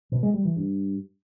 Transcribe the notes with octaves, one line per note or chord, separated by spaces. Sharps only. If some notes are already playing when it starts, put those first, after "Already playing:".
B2
G#3
G3
E3
G2